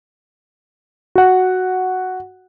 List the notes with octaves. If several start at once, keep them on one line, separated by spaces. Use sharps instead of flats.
F#4 F#5